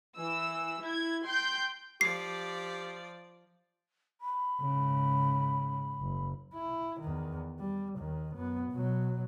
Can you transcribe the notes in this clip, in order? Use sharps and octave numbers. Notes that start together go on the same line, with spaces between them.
E3 E6
E4 G#6
G5 C6 G6
F3 G4 D5 C7
B5
G#2 C#3
F#1
E4
E2 D#3
G3
D#2 D#3
F#2 B3
B2 F#3